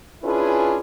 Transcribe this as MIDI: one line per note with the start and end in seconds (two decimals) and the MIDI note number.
0.23 0.79 61
0.23 0.79 62
0.23 0.79 64
0.23 0.79 65
0.23 0.79 68
0.23 0.79 71